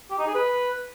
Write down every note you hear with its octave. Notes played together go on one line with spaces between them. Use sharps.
G4
D#4
G#4
B4